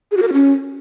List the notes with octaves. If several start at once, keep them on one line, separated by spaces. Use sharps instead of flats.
G#4
F#4
A#4
F#4
C#4